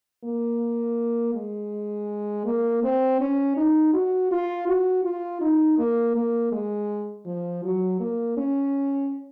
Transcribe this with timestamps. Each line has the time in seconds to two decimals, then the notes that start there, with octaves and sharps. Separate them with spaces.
0.24 A#3
1.35 G#3
2.45 A#3
2.83 C4
3.20 C#4
3.57 D#4
3.93 F#4
4.31 F4
4.67 F#4
5.04 F4
5.41 D#4
5.78 A#3
6.16 A#3
6.52 G#3
7.26 F3
7.64 F#3
8.00 A#3
8.37 C#4